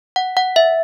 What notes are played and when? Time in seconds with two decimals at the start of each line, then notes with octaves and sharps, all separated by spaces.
0.16 F#5
0.37 F#5
0.56 E5